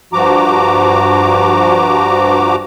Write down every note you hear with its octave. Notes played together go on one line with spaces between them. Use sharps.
G2 F3 F#4 A#5 D6